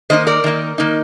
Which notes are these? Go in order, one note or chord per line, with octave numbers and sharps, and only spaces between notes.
D#3 A#3 D#4 C5 D#5
A#4 D5
D#3 A#3 D#4
D#3 A#3 D#4